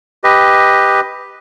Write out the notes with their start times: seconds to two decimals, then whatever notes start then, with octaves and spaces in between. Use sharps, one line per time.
0.24 G4 B4 D#5